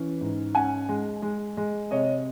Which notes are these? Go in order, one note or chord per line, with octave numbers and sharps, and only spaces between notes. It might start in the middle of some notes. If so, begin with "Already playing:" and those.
Already playing: E3 C#4
G#2
C#4 F#5 G#5
G#3
G#3
G#3
C3 C#5 D#5